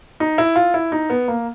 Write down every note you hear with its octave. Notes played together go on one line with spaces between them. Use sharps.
D#4
E4
F4
E4
D#4
B3
A#3